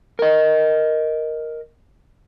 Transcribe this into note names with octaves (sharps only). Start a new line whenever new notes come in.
A#4 D#5